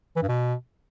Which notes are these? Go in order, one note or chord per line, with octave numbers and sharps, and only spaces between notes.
E3
G2
B2